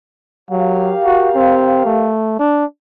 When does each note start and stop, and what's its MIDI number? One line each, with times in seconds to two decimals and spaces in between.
0.51 0.95 54
0.51 2.12 67
0.51 2.12 70
0.51 2.12 77
1.04 1.29 66
1.35 1.81 60
1.85 2.36 57
2.39 2.65 62